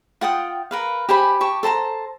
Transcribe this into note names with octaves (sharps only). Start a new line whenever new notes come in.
F4 F#5 G5 D#6
A#4 B4 F5
G4 C5 G#5 B5
G4 A5 C#6
A4 C5 A5 A#5